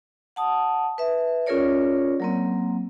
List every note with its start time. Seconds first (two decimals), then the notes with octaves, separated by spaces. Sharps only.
0.36 F#5 A5 D#6
0.98 B4 E5
1.46 C#4 F4 G#4 A#4 C#5 D5
2.20 F#3 A#3 C4